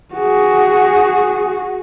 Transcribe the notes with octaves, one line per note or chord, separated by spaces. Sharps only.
F#4 G#4